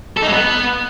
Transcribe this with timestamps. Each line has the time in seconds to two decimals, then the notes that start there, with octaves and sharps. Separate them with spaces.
0.17 A4
0.22 D#4
0.28 G#3
0.33 B3